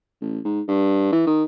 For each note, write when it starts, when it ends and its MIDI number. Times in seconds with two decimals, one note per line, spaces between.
0.21 0.39 33
0.45 0.61 44
0.68 1.12 43
1.13 1.23 52
1.26 1.44 51